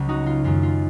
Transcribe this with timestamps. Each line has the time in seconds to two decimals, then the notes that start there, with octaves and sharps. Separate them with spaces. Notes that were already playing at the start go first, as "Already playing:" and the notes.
Already playing: C#2 C#3 F#3
0.09 D#4 F#4
0.26 F4
0.44 F#2 D#3 G#3 F4
0.63 F4